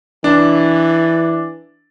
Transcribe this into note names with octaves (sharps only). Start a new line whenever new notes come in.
E3 D4